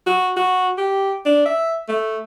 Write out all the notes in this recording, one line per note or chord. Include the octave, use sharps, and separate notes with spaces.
F#4
F#4
G4
D4
E5
A3